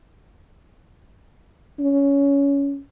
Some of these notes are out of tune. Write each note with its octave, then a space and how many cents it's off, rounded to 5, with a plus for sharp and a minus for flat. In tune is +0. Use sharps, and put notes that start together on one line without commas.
C#4 +15